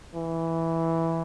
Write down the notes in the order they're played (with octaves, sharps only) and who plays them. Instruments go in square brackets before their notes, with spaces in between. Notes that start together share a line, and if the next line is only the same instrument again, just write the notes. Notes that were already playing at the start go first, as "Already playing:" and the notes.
[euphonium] E3